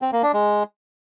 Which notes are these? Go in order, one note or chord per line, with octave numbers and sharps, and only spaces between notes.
C4
A#3
D4
G#3